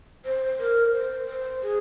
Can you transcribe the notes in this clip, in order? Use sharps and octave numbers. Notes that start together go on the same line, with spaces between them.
C5
A#4
C5
C5
G#4